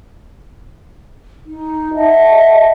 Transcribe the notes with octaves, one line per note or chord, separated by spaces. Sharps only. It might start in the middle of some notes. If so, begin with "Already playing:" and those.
D#4
D#5 E5 F#5 A5